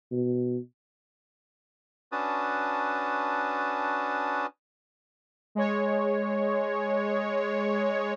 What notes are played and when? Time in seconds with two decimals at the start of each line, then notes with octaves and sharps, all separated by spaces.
0.12 B2
2.12 C#4 D4 F#4 B4 A5 D#6
5.55 G#3 C#5